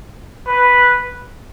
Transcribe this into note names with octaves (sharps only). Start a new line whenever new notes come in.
B4